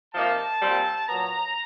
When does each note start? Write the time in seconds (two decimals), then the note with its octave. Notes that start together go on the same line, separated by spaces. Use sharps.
0.14 C3 F3 A#3 D#4 A5
0.61 A#2 G3 C4
1.09 A#2 F#3 B3 A#5